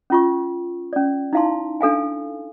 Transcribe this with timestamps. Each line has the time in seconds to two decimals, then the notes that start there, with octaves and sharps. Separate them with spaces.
0.10 C#4 F4 C#6
0.93 C#4 D5
1.33 D#4 E4 F5 A5 C6
1.81 D4 A4 F5 G#5